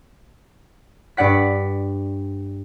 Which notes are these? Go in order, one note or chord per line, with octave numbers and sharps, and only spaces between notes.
G2 D5 F#5 B6